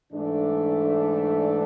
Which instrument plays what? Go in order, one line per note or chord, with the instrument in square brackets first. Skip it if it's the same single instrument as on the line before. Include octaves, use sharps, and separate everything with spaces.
[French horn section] G#2 E3 A3 D4